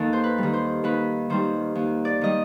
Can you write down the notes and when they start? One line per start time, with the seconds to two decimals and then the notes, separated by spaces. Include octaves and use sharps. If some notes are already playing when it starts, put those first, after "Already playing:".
Already playing: D#2 D#3 A4
0.13 C5
0.24 B4
0.38 D#3 G3
0.53 C5
0.84 D#2 B4
1.30 D#3 G3 C5
1.75 D#2
2.05 D5
2.21 D#3 G3 D#5